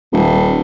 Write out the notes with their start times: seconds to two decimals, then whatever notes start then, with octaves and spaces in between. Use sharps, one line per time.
0.13 D#1